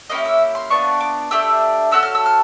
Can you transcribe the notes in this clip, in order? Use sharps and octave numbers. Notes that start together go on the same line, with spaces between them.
A#3 C#4 E4 G4 D#5
E5
C6
B3 D4 F4 C#6
D6
A3 D4 G4 E6
C#4 F#4 A4 E6
F6
E6
F6